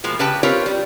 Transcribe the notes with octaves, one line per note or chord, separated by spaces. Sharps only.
B2 F3 G#3 A#3
C#3 G4 B4 G5 A5
C4 F4 G4 A#4 B4 C#5
G3